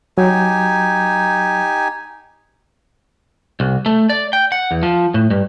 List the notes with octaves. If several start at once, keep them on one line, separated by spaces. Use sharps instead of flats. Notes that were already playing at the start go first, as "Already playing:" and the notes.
F#3 D#4 G4 G#5
C2
A3
D5
G5
F#5
E2
F3
A2
G2